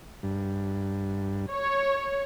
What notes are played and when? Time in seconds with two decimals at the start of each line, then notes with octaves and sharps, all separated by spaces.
0.23 G2
1.50 C#5